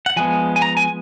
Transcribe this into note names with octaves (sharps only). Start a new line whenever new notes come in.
F#5
F3 G#3 B3 G#5
G#5
A#5
G#5